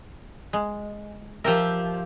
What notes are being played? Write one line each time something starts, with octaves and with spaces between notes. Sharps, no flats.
G#3
F3 G4 A#4 E5